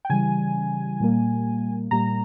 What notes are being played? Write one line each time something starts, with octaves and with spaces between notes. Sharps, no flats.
G5
C#3 E3 G3 G#5
A#2 G3 A#3
A#2 G3 A#3 A#5